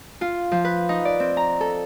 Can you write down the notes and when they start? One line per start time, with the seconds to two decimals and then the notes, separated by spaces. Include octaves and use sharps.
0.21 F4
0.52 F3
0.65 B4
0.89 D#4
1.05 D5
1.20 C4
1.37 A#5
1.61 A4